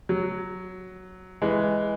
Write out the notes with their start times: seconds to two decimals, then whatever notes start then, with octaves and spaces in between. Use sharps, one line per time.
0.09 F#3
1.42 E3 G#3